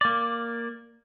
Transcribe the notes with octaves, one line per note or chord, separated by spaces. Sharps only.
A#3 D5